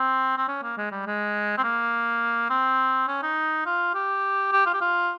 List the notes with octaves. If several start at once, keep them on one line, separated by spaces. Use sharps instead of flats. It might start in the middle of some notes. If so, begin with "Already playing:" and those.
Already playing: C4
C4
C#4
A#3
G#3
G3
G#3
C4
A#3
C4
C#4
D#4
F4
G4
G4
F4
G4
F4